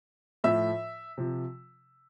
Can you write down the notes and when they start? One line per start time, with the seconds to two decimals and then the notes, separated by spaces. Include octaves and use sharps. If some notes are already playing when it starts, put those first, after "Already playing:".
0.44 A2 F3 E5 E6
1.18 C3 F3